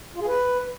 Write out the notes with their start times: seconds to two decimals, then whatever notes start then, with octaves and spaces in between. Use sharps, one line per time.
0.16 F4
0.22 G#4
0.27 B4